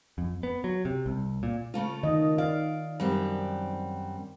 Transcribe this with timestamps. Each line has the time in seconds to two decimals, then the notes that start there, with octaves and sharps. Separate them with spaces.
0.18 F2
0.43 B3
0.64 F#3
0.85 C3
1.06 C2
1.43 A#2
1.74 C#3 A3 F4
2.03 D#3 D#5
2.38 D5 F5
3.00 F#2 G3 C4